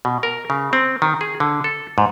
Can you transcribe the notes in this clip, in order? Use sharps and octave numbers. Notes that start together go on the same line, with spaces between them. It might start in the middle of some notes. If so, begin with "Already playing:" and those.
B2
A#4
C#3
C4
D#3
G#4
D3
A4
G#2